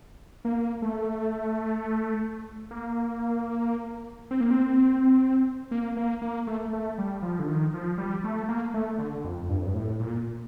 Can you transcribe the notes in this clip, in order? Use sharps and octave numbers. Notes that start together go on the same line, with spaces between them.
A#3
A3
A#3
C4
A#3
C4
A#3
A#3
A#3
A3
A3
G3
F3
D3
D#3
F3
G3
A3
A#3
A3
D3
F2
G2
F2
G2
A2
A#2